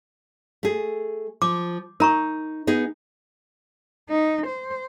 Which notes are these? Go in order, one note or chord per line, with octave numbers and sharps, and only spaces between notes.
A3 G#4
F3 D6
D#4 A#4 A#5 C#6
B3 D#4 G#4
D#4
C5